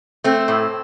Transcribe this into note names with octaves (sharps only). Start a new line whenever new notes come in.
A3 C4
A2